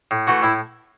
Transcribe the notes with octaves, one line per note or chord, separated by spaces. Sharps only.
A2
E3 A3 F#4
A2 E4